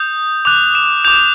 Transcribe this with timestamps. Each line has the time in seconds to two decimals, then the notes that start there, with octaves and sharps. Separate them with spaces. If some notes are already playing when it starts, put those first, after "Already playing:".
Already playing: D#6 G6
0.45 D6 F#6 F7
0.75 E7
1.05 G6 F7
1.08 D6